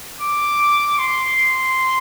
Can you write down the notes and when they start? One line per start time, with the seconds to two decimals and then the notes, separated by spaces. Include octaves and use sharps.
0.21 D6
0.99 C6